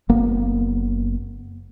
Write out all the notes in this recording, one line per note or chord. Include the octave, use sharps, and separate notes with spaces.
F#1 A#3 B3